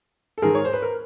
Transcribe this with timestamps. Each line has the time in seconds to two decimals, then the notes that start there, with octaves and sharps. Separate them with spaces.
0.38 A4
0.42 G#2 D#3 G#4 A#4
0.55 C#5
0.65 C5
0.73 B4
0.82 A#4